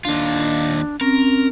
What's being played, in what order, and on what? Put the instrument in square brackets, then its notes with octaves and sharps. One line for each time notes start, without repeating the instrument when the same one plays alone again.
[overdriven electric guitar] D#2 F4 [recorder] D4
[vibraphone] C4 C#4 [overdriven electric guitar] A#4